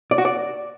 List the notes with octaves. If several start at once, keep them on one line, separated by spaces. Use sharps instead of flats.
D5
F#4
D5